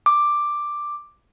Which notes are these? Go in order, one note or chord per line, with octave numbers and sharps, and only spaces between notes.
D6